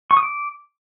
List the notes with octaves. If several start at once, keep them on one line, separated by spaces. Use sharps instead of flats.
C#6
D#6
D6